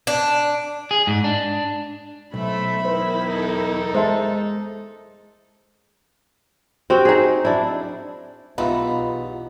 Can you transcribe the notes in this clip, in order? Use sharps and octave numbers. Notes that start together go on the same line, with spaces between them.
D4
G#4
G#2
D4
B1 A3 C5 E5 B5
E2 D#3 E4 B4 C5
D#4 A4
G#3 C5 E5 A5
C4 F#4 G4
D#4 G#4
D4 E4
B1 E2 G2 B3 D#4 F4 E5